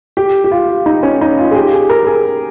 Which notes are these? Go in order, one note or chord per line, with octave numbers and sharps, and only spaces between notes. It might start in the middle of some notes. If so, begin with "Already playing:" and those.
G4
G4
F4
D#4
C#4
D#4
F4
G#4
G4
G#4
A#4
G#4